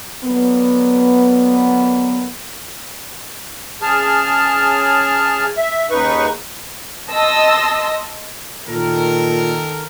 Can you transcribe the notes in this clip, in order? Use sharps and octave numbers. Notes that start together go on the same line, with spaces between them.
D3 F#3 A#3 B3
C#3 G#4 A5 F6
E5
D#2 C#3 D#4 B4 C#6
D#5 A5 C6 D#6 E6 A#6
A#2 D#3 A4 A#4